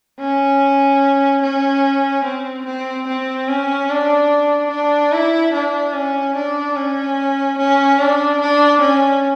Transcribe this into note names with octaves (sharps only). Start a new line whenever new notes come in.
C#4
C#4
C4
C4
C4
C#4
D4
D4
E4
D4
C#4
D4
C#4
C#4
D4
D4
C#4